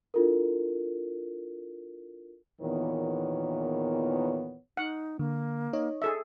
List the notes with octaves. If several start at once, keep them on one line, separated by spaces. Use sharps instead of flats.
D4 E4 F4 A4 A#4
E2 A#2 D#3 E3 B3 C#5
D#4 F#5
D3 A#3
D#4 C#5 D#5
G#4 A4 E5